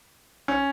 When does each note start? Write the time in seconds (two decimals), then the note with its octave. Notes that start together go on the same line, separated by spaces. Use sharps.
0.48 C#4